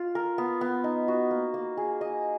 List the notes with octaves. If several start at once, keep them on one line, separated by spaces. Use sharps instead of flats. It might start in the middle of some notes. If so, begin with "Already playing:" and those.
Already playing: F4
A#4
B3
B3
D#4
F#4
A#3
A#3
G#4
D#5